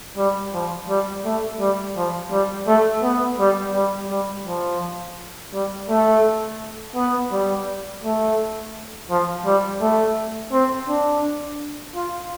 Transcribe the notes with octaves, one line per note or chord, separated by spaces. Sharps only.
G3
F3
G3
A3
G3
F3
G3
A3
B3
G3
G3
G3
F3
G3
A3
B3
G3
A3
F3
G3
A3
C4
D4
F4